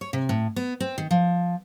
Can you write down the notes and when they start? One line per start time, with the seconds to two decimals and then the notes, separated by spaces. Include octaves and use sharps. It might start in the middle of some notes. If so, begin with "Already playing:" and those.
0.01 C#5
0.13 C3
0.29 A2
0.56 B3
0.80 C4
0.98 D#3
1.11 F3